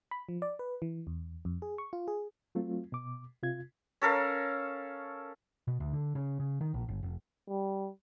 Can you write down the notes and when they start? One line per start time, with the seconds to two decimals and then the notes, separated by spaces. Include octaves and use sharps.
0.11 B5
0.29 F3
0.42 D5
0.59 B4
0.82 E3
1.07 E2
1.45 F2
1.62 G#4
1.78 C#6
1.93 F4
2.08 G#4
2.55 F#3 A3 C4 F4
2.92 B2 D6
3.43 C3 F4 G#6
4.02 C#4 A4 A#4 F5
5.68 B2
5.80 D2
5.93 D3
6.15 C#3
6.40 C#3
6.61 D#3
6.74 A#1
6.88 G1
7.03 F1
7.48 G3